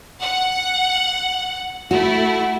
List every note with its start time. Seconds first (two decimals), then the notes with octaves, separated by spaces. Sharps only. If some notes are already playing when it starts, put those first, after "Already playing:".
0.21 F#5
1.91 A3 E4 F#4